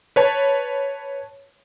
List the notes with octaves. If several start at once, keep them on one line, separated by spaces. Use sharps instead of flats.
B4 C#5 A5